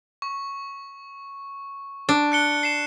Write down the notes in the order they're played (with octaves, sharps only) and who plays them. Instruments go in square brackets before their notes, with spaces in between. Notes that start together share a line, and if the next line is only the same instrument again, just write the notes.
[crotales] C#6
[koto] D4
[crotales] F#6 C#7 G7
C7 E7